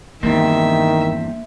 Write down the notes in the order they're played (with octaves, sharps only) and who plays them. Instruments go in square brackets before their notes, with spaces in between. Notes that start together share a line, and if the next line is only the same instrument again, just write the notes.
[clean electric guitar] E2 G2 C4 [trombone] D#3 [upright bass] A#3 [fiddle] E5